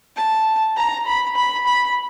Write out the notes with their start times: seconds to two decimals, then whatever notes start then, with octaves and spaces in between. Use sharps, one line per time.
0.16 A5
0.76 A#5
1.06 B5
1.36 B5
1.66 B5